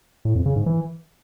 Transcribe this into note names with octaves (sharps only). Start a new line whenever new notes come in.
A2
F2
C#3
G#2
E3